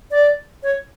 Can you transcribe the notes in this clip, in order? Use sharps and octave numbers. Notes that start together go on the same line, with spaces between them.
D5
C#5